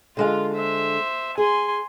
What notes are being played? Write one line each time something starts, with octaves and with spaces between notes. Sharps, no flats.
D3 G#3 F4 F5
C5 E5
G#4 G#5 C6